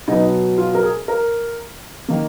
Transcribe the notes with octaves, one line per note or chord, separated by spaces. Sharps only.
B2 F#3 B3 D#4
F4
A#4
G#4
A#4
D#3 A#3